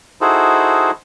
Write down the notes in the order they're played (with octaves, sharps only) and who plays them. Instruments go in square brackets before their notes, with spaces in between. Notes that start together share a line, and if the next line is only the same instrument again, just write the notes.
[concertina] D#4 E4 F#4 G#4 A4 C5